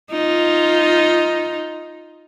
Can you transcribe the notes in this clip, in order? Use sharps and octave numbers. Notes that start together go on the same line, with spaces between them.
D#4 F4